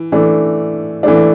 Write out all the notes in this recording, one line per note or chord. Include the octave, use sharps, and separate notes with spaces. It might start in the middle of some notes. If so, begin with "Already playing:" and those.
Already playing: E3
E3 A3 D4
E3 A3 D4